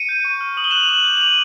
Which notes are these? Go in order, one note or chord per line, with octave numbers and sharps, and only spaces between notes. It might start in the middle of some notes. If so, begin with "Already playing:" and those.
Already playing: C#7 D#7
G6
C#6
F6
D#6 F#7
G7
F#6 E7 F#7
F7
D6 E7 F#7
G6
F#7
D6 D#7 F7